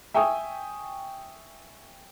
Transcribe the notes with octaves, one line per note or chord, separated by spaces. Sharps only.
E5 G5 G#5 C#6 D#6